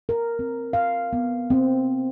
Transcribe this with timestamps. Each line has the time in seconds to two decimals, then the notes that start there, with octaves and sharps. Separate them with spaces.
0.09 A#4
0.39 C4
0.73 F5
1.13 B3
1.50 C4